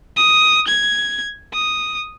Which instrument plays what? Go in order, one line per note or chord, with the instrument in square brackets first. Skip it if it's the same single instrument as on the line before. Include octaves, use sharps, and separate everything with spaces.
[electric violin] D#6
G#6
D#6